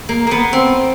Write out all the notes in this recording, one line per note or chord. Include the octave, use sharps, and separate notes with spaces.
A#3
A#3 B3
C4